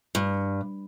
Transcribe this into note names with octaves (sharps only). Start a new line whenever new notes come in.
G2